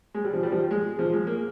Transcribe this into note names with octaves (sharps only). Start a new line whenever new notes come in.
G#3
G3
F3
G3
F3
G#3
F3
G#3
A#3